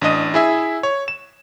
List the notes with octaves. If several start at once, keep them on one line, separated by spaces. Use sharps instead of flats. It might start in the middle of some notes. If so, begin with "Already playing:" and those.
A1 D4 D#5 D#7
E4 G#4 E5
C#5
E7